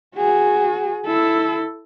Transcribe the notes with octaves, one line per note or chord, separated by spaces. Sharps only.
F#4 G#4
E4 A4